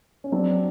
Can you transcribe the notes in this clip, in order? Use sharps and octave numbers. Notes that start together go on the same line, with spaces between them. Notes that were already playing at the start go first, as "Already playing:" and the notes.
C#4
F#3 C4 D4